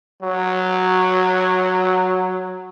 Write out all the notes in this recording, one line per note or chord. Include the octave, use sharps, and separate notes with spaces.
F#3 F#4